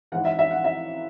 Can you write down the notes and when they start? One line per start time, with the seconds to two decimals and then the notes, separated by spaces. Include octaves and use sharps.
0.12 G#2 E3 F#5
0.25 E5
0.39 E5
0.51 F#5
0.65 E5